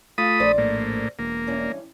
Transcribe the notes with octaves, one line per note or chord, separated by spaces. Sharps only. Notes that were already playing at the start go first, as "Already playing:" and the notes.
A3 F4 B5 D#6
A#1 C4 C5 D5
A2 A#3
E1 A#3
G2 E3 C#4